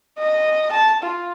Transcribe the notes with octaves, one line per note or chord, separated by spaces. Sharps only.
D#5
A5
F4